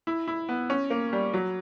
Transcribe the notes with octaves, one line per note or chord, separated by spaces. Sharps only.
E4
E4
B3
C#4
A#3
G3
F#3